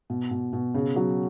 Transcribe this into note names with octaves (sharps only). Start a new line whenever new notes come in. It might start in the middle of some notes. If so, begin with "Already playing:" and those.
B2
B2
B2
C#3
F#3